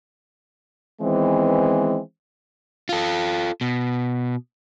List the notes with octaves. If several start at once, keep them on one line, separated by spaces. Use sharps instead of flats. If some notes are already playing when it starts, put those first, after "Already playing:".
D#3 E3 G#3 B3 C4
F4 A4
B2